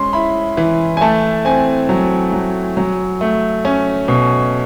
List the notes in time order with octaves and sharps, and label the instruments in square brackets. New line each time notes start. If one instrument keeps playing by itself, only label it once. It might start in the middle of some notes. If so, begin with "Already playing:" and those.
Already playing: [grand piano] G#3 C#4 C6
E4 B5
E3
G#5
A3 A5
C4 G#5
F#3
F#3
F#3
A3
C#4 G#5
B2